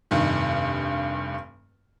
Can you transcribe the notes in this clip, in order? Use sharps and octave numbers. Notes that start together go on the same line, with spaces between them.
F1 G2 D#3